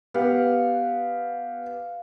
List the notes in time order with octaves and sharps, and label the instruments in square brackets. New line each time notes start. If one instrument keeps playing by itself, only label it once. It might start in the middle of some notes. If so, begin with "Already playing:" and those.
[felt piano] B3 G4 [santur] F5 F#5